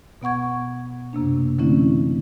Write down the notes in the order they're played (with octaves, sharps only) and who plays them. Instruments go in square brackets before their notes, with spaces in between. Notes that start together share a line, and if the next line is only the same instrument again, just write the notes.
[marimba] B2 B3 F#5 C#6 G#6
F#2 C3 A#3 D4
D3 E3 A3 C4 C#4 E4